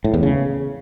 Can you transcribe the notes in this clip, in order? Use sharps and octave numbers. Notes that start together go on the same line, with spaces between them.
A2
E2
C#3